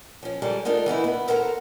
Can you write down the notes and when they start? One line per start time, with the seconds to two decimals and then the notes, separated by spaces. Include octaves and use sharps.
0.23 F3 C#4
0.42 F2 G3 G#3 A4 A#4
0.65 G#3 D4 D#4 F4 A4 A#4
0.86 E3 B3 D#4 E4
1.04 B3
1.28 A4 A#4 C5 F#5 G#5 A#5